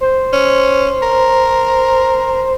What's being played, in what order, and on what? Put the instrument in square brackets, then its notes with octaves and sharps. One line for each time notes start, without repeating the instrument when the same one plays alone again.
[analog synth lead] C5
[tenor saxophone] C#4
A#4